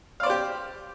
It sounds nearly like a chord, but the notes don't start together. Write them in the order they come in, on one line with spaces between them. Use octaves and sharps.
F5 D5 C5 G4